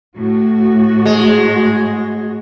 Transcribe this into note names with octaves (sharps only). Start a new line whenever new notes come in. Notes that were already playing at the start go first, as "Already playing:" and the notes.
A2 F#4
G#3